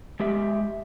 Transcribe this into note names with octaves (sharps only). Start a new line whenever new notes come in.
G#3 G4 E5